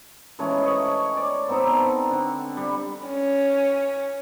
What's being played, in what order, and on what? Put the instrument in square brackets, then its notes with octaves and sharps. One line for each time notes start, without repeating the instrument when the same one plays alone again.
[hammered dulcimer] E3 G#3 A3 C#4
D#5 G#5 C#6
D5
B3 C4 D#4 A4
D3
G3
[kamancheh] C#4